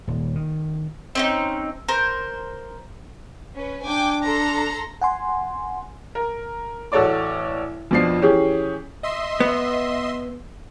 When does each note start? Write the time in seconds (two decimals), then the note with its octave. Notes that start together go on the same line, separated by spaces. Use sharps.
0.07 D#1
0.35 D#3
1.15 C4 C#4 D#4
1.88 A#4 C5
3.55 C#4 B4
3.86 D4 G5 G#5 D6
4.25 A4 A#5 C6
5.02 F#5 G#5 C6
6.15 A#4
6.92 A1 F#4 A4 C#5 D5 D6
7.91 F2 B2 F3 D4 C7
8.21 E3 C#4 G4 G#4
9.03 D#5 E5 C6
9.40 B3